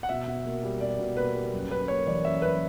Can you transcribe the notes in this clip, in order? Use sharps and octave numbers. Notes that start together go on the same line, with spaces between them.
F#5
B2 E5
B2
A#3
G3
B2 D5
B2
A#3 B4
G3
F#2
F#2 B4
A#3 C#5
E3 D5
F#2 E5
F#2 B4